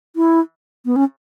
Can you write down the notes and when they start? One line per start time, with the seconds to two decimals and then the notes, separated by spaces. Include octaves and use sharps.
0.16 E4
0.86 B3
0.96 C#4